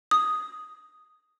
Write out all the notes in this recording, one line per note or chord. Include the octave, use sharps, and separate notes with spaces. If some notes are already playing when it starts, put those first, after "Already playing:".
D#6